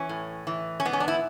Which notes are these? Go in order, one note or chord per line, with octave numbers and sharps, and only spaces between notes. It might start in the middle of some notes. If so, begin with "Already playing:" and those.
Already playing: E3 C#4
A2
E3
C#4
G#2 B3
C#4
D4
E4